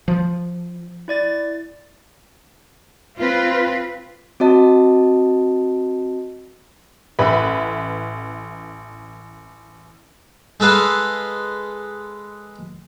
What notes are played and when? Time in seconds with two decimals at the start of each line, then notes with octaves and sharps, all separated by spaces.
0.08 F3
1.08 E4 D5 A6
3.19 C4 F4 B4
4.40 C4 F#4 D#5 A5
7.19 A1 B4 E5 B5
10.60 G#3 A4 B4 F5